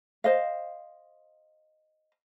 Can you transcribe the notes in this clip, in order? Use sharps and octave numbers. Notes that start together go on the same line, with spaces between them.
C5 D#5 F5